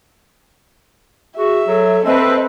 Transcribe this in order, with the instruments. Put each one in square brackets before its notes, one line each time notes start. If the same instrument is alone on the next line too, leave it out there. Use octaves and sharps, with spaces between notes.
[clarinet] F#4 [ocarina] G#4 [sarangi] E5
[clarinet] F#3 [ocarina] A4
[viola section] C4 B4 [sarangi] A4 [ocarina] D#5 [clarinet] E5